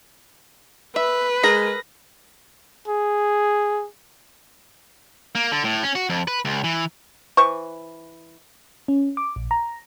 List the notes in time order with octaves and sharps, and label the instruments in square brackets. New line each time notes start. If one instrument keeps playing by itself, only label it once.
[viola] B4 [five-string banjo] E5
[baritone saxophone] G#3 [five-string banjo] G#4 A#4 [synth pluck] A#6
[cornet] G#4
[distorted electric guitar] A#3
D3
A2
C#4
F#4
F2
B4
C#2
E3
[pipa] E3 C5 C#6
[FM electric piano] C#4
D6
A#1
A#5